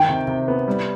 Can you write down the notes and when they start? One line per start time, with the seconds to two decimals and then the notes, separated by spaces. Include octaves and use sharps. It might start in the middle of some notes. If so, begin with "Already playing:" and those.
Already playing: D#3 G5
0.09 C3
0.27 C3
0.48 B3
0.68 G3